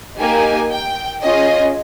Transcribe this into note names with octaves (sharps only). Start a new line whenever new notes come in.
A#3 D#4 G4 G#5
G5
C#4 F4 G#4 D#5